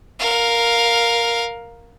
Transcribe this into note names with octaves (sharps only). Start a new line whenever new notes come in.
A#4 F5